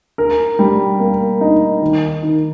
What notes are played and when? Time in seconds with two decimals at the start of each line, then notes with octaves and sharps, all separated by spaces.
0.18 A#4
0.59 G3
1.00 A#3
1.41 D#4
1.82 D#3
2.23 D#3